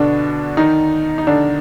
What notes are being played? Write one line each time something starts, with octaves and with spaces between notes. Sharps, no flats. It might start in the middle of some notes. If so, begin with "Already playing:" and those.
Already playing: B2 D3 D4
D#3 D#4
D#4
D3 D4